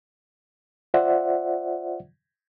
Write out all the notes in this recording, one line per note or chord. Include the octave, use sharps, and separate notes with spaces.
F4 C5 D5 E5 F#5